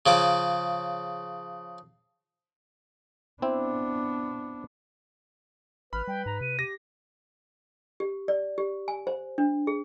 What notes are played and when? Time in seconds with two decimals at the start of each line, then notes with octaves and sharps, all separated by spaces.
0.06 C#3 F3 D6
3.42 B3 C4 D4 E4
5.93 A1 B4 B5 F6
6.07 G3 G5
6.26 G#2 A#5
6.41 C3 D#7
6.59 G4 A#6
8.00 G4
8.28 D5
8.58 G4
8.88 G#5
9.07 C5
9.38 D4
9.67 G#4